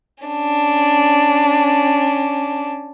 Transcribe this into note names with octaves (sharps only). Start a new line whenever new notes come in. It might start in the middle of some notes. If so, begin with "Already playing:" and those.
C#4 D4